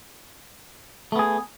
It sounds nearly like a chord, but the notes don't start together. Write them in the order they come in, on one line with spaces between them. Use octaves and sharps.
A3 B3 G#4